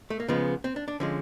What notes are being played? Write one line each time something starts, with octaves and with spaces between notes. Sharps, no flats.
A3
A#3
C#3 F3 G#3 B3
C4
D4
D4
D3 F3 G#3 C#4